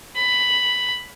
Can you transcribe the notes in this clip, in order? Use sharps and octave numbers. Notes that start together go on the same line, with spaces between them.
B5